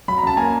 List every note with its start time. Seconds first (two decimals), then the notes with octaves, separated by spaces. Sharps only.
0.08 F#3 B5
0.18 A#5
0.23 F#2 A5
0.37 A#3 G#5 A#5